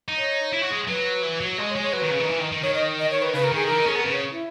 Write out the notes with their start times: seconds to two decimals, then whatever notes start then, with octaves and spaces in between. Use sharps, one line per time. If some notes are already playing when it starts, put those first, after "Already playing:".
0.08 D#4
0.17 C#5
0.52 E4
0.61 F#4
0.70 G#3
0.88 F#3 B4
1.23 E3
1.40 F#3
1.58 G#3 D#5
1.70 C#5
1.75 G#3
1.82 C#5
1.93 F#3 B4
2.02 D#3
2.10 C#3
2.20 D#3
2.29 E3
2.40 D#3
2.52 D#3
2.63 D#3 C#5
2.75 D#5
2.99 D#5
3.11 C#5
3.22 B4
3.34 C#3 B4
3.44 A#4
3.51 D#3 G#4
3.66 E3 A#4
3.78 D#4
3.87 C#4 G#4
3.95 B3 A#4
4.04 C#3 B4
4.14 C#5
4.31 E4